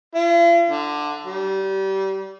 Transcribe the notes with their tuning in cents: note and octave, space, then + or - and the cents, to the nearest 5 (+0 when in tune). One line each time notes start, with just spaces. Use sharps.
F4 -45
D3 +10
G3 -25